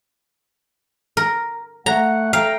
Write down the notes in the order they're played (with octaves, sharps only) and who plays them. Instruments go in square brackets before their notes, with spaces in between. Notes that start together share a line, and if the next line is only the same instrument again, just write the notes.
[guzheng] A#4
[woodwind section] A3 F#5 [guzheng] A#5
[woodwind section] A3 G5 A#5 [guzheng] F5